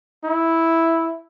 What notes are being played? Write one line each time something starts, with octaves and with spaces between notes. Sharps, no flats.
E4